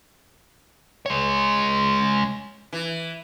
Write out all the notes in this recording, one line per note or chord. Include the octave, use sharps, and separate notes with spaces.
G#3 C#5
E3